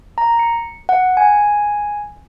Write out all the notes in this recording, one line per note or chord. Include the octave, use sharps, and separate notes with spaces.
A#5
C#7
F#5
G#5